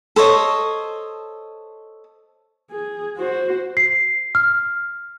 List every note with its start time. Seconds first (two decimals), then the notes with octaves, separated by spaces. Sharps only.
0.16 A4 C5 C#5 D#5
2.71 G#4
3.17 F#4 C5
3.77 C7
4.35 F6